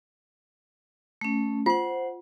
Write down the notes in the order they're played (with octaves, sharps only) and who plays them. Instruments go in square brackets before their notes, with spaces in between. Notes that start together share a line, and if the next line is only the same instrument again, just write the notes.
[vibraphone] A3 C#4
[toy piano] F4 [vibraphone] C5 F#5